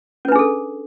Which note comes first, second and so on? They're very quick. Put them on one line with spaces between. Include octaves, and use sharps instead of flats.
C#4 B4 D4 G#4 A4